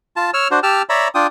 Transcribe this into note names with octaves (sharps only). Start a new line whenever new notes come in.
F4 A5
C#5 E6 F6
D4 F#4 C5
G4 G5 A5 E6 F6
C#5 D5 E5 A#5 B5
D4 F4 G5 D#6